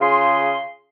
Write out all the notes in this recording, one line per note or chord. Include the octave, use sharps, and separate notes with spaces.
C#3 F4 G#4 G#5 C6